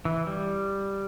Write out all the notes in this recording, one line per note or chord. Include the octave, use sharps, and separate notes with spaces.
E3
G3